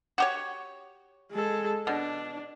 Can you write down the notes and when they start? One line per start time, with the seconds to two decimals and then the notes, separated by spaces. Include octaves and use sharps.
0.18 F#4 G4 C#5
1.32 G#3 A4
1.87 B2 D4